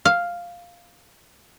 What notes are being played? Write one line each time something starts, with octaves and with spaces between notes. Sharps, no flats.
F5